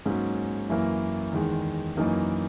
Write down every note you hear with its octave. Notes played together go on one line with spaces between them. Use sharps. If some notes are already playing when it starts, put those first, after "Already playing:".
G#2 F#3 A#3 C#4
F#2 E3 A#3 E4
E2 D#3 G#3
F#2 E3 A#3 D#4